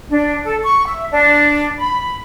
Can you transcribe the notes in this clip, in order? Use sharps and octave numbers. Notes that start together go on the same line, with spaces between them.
D4
A4
C#6
E5
D4
B5